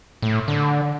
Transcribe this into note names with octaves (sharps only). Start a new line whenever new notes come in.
A2
D3